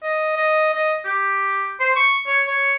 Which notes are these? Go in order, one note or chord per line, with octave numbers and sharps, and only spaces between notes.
D#5
D#5
D#5
G4
C5
C#6
C#5
C#5